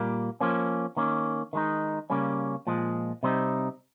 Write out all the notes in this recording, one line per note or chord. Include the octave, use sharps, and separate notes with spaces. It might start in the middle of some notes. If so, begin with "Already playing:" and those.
Already playing: A#2 G3 A#3
F3 A#3 C#4
D#3 A#3 C#4
D#3 G#3 D#4
C#3 G3 A#3 C#4
A#2 F3 G#3
C3 G3 C4 D#4